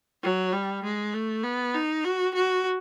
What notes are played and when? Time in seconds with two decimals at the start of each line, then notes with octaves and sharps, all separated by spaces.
0.23 F#3
0.53 G3
0.84 G#3
1.14 A3
1.44 B3
1.74 D#4
2.05 F#4
2.35 F#4